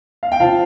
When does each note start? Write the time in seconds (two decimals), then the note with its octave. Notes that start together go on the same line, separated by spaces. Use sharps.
0.23 F5
0.32 G5
0.40 F3 C4 F4 F5 A5